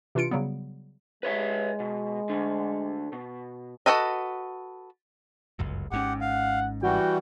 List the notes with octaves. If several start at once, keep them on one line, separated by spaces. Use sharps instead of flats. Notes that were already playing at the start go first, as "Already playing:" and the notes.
C3 E3 D4 F4 C#7 D7
C#3 F#3 G3 B3
G#3 B4 C#5 E5
B2
D2 D3
B2
F#4 G#4 A4 B4 D#5
G1 C#2 F#2
G#1 G#2 C#4 G4 F#5
F5 F#5
E3 G3 F#4 G5